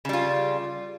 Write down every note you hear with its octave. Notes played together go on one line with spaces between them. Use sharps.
C#3 G3 F4